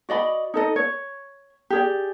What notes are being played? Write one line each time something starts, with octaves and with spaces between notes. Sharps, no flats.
F#4 D5 D#5 B5
D#4 A4 D#5
C#5
G4 G#4 D5